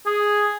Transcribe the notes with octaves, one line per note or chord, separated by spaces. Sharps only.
G#4